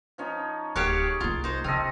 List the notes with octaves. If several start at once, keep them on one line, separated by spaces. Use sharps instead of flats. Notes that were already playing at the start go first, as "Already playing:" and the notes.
F3 C#4 D#4
D1 G4 G#4 C#5 F5 F#5
C2 A#3 F4
D#4 C5
C#3 C4 F4 A4 D#5